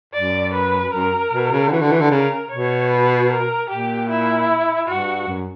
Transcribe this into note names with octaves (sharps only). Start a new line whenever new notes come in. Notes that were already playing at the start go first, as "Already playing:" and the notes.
F#2 D5
B4
F#2 A#4
B2
C#3
D3
E3 F#4
D3
E3
D3
C#3 A#4
B2 C#5
B4
A#4
A#2 G4
E4
G2 F#4
F#2